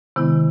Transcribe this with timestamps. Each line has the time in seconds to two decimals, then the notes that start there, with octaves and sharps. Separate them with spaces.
0.16 C3 D#3 G#3 B3 E4